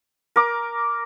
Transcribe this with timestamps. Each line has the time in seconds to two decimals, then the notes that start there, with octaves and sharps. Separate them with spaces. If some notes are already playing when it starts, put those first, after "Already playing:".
0.36 A#4 D6